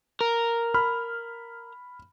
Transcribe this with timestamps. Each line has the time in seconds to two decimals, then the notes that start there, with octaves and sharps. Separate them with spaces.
0.21 A#4
0.74 B5 F6